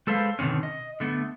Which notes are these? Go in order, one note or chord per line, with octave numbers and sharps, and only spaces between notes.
G#3 A4 B4 C5 F5
B2 D3 D#3 C4 C#4
D#5
D3 A3 B3